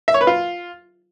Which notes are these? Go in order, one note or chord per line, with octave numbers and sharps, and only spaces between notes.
E5
C#5
B4
F4